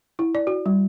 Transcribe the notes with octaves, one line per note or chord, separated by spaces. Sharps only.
E4
D5
F#4
G3